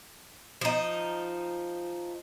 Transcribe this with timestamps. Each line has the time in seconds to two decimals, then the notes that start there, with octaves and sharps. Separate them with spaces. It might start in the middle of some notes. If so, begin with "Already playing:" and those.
0.61 F3 D#4